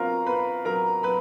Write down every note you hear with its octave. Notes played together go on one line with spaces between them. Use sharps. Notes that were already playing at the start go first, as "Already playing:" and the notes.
Already playing: B2 F#3 C4 F4 A#4 F5 A#5
B2 B4 B5
F#3 A#4 A#5
F#3 B4 B5